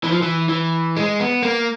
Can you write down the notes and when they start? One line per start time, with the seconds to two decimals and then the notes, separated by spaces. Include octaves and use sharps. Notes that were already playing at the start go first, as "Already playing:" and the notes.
0.04 E3
0.12 F3
0.22 E3
0.49 E3
0.97 G#3
1.20 B3
1.43 A#3